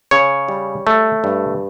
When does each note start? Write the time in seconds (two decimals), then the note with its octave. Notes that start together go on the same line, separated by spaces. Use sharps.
0.11 C#3 C#5
0.48 G3
0.87 A3
1.24 G2